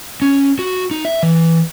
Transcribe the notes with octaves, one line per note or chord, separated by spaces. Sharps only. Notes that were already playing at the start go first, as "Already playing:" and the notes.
C#4
F#4
D#4
E5
E3